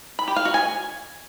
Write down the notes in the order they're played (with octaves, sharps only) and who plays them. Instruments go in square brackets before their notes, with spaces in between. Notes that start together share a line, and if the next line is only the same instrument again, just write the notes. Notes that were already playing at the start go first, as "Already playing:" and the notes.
[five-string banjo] B5
G4
F5
F#4
G#5